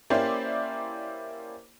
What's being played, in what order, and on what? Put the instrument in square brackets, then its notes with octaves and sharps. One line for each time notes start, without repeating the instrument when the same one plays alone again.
[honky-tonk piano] A#3 C#4 E4 G4 C5 D5